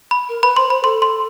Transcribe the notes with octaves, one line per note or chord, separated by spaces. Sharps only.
B5
A#4
B4 B5
C5 C6
C5 B5
A4 C6
C6